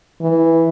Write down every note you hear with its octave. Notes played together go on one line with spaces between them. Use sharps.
E3